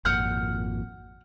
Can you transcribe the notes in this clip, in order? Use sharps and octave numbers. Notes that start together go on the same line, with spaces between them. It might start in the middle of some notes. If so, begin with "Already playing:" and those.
G#1 F2 A#2 F#5 F6 G6